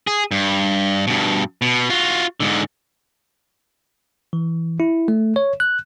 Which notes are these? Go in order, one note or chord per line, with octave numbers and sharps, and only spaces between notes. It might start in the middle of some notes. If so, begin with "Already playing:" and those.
G#4
G2
G2 B2
B2
F4 F#4
G#2 D3
E3
E4
A3
C#5
F#6